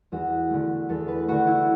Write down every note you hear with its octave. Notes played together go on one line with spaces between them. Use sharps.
E2 F#4
D3 A3
E2 A4
B4
D3 A3 F#4
E4